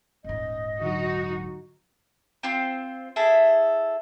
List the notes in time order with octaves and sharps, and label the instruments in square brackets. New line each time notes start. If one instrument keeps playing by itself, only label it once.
[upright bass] D#1 G#2 [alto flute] D#5
[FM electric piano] D3 F#3 [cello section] D#4 F#4
[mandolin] C4 F4
E4 G#4 A4